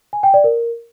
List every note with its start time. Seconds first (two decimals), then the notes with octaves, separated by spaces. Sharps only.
0.13 G#5
0.23 G5
0.34 D5
0.44 A#4